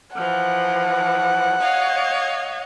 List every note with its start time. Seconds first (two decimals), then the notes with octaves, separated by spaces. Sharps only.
0.15 E3 F3 F#5
1.60 C#5 D#5 F5